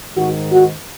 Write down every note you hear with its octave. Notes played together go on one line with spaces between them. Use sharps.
G#2 D#3 F#4
F#4